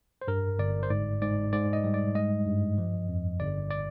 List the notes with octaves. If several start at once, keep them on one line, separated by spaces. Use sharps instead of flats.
C5
G2 A#4
G1 D5
C5
G#2 D5
G#2 D5
G#2 D5
D#5
G3
D5
G#3 D#5
G2
F3
F2
G1 D5
D5